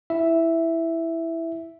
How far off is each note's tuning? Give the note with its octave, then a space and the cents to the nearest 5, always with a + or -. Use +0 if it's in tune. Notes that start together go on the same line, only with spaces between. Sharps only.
E4 +0 E5 +0